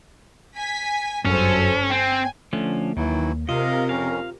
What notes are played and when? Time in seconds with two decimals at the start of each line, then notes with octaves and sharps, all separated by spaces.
0.56 G#5 B6
1.25 G1 F#2 C#4 A4 C5
1.90 C4 G5 G#5
2.53 D3 F3 A3 C#4
2.97 D#2 D#3 E3 F#3 A#3 E4
3.49 C3 F4 A#4 D#5 F5
3.89 F2 C#4 F5